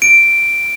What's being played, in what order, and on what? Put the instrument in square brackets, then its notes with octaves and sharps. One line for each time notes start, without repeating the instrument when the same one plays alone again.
[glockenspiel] D7